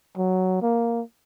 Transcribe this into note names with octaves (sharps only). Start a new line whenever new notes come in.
F#3
A#3